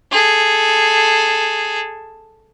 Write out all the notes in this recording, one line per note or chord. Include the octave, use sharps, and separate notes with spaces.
G#4 A4